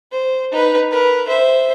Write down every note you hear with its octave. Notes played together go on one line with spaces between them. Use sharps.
C5
D#4 B4
A#4 B4
C5 E5